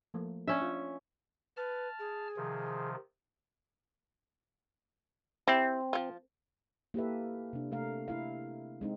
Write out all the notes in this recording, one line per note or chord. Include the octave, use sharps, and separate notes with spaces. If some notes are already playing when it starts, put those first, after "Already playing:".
F3 A3 A#3
C#4 D4 C#5 E5
F4
B4 A5 F6
G#4
C3 D#3 F3
C4 E4 G4
F3 F4
A#3 E4 G4 A4 B4 E5
C3 D4
C3 A3 A#4 F5
E4 F5
G#3 C4 D#4